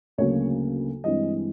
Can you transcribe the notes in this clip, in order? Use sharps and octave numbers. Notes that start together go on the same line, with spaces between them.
D2 C#3 F#3 A#3 C#5
G2 E3 G#3 C4 D#5